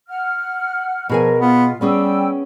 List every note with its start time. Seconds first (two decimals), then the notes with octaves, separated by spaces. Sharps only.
0.08 F#5 F6
1.09 B2 F3 G#4 A#4 G#5
1.40 B3 F4
1.81 G3 B3 C#4 G#4 G5 E6